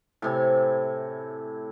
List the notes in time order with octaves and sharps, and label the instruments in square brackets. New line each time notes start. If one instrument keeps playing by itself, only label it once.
[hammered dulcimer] A2 C3 G#5